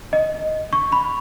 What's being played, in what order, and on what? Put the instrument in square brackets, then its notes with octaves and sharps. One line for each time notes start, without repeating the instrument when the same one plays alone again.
[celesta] D#5
C#6
B5